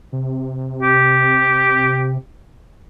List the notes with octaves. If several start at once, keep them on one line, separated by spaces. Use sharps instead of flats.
C3
G4